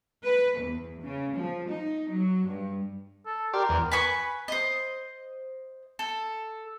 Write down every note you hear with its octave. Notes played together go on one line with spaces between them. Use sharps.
B4
E2
C#3
F3
D#4
F#3
G2
A4
G4 A#4 D5 C6
E2
B4 G#5 B5 C#6
C5 D#5
A4